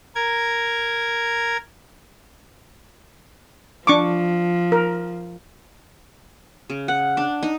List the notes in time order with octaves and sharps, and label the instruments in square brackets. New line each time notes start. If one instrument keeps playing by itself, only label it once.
[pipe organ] A#4 G#6
[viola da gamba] F3 [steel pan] D4 C#6 D6
[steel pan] A#4
[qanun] C#3
F#5
D4
D#4